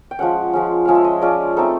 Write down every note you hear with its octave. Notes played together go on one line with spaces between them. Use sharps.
G5
F3 G#3 C#4 F#5
F3 G#3 C#4
F3 G#3 C#4 F5
E5
D#5
F3 G#3 C#4 D5
A3 C4 D#4 A4